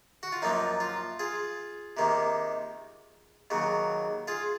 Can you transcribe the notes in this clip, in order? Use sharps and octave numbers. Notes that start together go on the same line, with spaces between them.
F#4
F4
F#2 F3 A#3 D#4
F4
F4 G#4
C3 D#3 A#3
D#2 C#3 F#3
F4 G#4